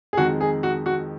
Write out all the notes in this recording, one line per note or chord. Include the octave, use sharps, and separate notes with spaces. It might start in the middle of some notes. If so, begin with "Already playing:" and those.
G#4
F2 D#3 G#3 F#4
G#4
F#4
F#4